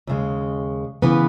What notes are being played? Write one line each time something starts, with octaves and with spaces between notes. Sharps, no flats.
D#2 C#3 G#3
C#3 E3 B3